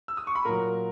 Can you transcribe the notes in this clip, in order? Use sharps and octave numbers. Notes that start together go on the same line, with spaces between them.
E6
D#6
C#6
B5
A#2 F#3 A#4 A#5